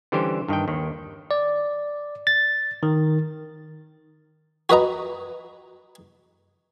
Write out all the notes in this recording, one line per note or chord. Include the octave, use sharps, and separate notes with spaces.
D3 E3 G3 C#4 G4 C5
G2 D#3 D#5 G5
D#2 D#3
D5
A6
D#3
F#4 B4 D#5 A#5